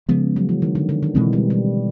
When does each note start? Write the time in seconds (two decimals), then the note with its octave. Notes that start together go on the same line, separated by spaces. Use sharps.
0.09 C#3 F3 G#3 B3
0.36 F#3
0.49 E3
0.62 D#3
0.75 D3
0.89 D3
1.03 D#3
1.15 B2 E3 G#3 C4
1.33 G3
1.50 G3